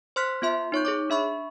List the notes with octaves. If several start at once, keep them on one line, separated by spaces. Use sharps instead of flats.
C5 C6 F6 F#6 B6
B3 F4 E5 C6
D#4 C#5 C#6 G6
G#4 C#5 D6
D4 E5 B5 C#6